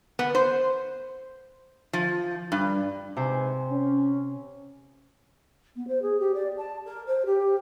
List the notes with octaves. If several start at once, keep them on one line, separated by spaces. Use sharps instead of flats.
B3
C5
F3
G2
G#2 C3 B4 C5 G#5
C#4
B3
C5
G#4
G4
D5
A5
A#4
C5
G4